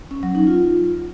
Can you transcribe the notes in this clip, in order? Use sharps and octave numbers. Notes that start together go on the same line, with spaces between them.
C#4
F#3
D#4
F4